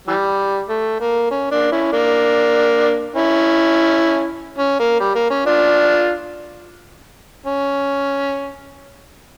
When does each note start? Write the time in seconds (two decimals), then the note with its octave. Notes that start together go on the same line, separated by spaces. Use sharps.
0.08 E3 G3
0.69 A3
1.00 A#3
1.31 C#4
1.51 A#3 D4
1.71 C#4 E4
1.92 A#3 D4
3.16 C#4 E4
4.58 C#4
4.79 A#3
5.00 G3
5.15 A#3
5.30 C#4
5.46 D4 F4
7.46 C#4